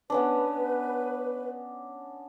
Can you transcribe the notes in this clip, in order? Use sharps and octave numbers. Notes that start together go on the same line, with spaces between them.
B3 C#4 D4 B4